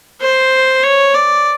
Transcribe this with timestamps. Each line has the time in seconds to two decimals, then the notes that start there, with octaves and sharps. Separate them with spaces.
0.21 C5
0.83 C#5
1.15 D5